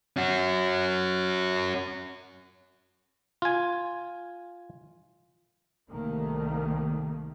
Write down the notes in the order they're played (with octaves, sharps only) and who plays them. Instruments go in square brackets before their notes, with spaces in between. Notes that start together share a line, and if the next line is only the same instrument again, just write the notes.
[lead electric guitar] C#4 F#4
[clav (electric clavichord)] F4 G#5
[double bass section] C2 D#3 A3 A#3